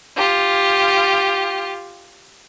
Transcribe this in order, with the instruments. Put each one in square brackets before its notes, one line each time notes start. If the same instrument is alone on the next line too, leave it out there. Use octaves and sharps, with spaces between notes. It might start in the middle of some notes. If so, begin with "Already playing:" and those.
[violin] F4 G4